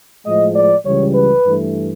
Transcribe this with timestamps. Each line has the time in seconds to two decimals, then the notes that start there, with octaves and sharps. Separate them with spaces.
0.25 A2 F3 G#3 D#5
0.55 D5
0.85 C#2 C#3 E3 G3 C#5
1.14 B4
1.45 G2 E3 A3